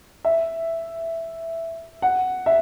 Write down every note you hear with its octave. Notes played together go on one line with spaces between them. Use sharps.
E5
F#5
E5